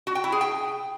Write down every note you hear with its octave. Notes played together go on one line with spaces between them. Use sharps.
F#4
G5
E4
G#4
G5